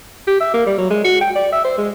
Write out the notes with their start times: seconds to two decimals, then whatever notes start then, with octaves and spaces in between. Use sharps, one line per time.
0.27 G4
0.41 E5
0.54 A#3
0.66 G3
0.78 F#3
0.90 G#3
1.04 F#4
1.21 G5
1.35 D5
1.53 E5
1.65 C5
1.78 G#3